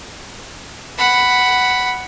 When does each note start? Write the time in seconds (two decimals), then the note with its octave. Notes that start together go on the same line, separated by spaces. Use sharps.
0.98 F#5 B5